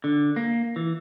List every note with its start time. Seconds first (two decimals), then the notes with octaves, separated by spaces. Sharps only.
0.04 D3
0.36 A#3
0.76 E3